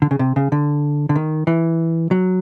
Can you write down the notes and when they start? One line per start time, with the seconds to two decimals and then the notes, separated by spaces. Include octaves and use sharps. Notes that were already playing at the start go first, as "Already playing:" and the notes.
0.02 D3
0.11 C#3
0.19 C3
0.36 C#3
0.52 D3
1.09 D3
1.16 D#3
1.47 E3
2.11 F#3